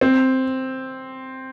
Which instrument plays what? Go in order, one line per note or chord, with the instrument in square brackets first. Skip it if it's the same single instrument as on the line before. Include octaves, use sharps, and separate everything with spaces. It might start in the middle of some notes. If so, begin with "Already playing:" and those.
[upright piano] C4